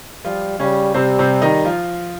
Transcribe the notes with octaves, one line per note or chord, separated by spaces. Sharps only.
F3 G3 F4
C#3 G3 C#4
C3 G3 C4
C3 C4
D#3 D#4
F3 F4